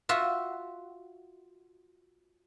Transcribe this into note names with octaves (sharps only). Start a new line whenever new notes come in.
F4 F#4 E5